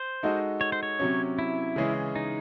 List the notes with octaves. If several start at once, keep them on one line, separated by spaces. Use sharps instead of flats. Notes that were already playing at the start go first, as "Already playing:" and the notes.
Already playing: C5
G#3 D#4 F#4 A4 D#5
C#5
C5
C#5
C3 F#3 C#4
E4
C#3 E3 G#3 C#4 G#4
D#4